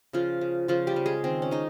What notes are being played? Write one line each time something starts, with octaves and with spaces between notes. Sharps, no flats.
C#3 F3 F4
C#3
C#3 F3 F4
G3 G4
C#3
G#3 G#4
D#3 C4
C#4
G#3 D#4